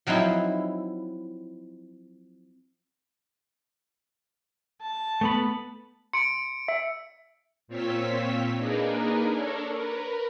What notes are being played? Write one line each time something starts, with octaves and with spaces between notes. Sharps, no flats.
F3 F#3 C4 D#4 E4
A5
A3 B3 B5
C6 C#7 D7
E5
A#2 C4 F4 C#5 E6 B6
A#3 D4 D#4 G#4 A#4 B4
D4 A4 A#4 C#5 D5
A#4 B4